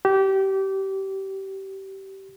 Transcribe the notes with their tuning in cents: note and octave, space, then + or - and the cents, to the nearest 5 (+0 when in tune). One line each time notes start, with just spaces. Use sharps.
G4 -25